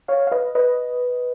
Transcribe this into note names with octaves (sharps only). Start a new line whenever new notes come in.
C#5 F5
F5
B4 D#5
B4 D#5